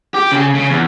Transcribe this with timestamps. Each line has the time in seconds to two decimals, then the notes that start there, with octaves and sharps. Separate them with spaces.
0.14 G4
0.32 C#3
0.55 C#3
0.69 E2